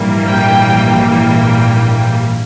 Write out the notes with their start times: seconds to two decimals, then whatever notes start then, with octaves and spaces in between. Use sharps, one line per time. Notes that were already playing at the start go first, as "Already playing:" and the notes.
Already playing: A#1 G#2 E3 G3 A#3
0.26 G5
0.91 G5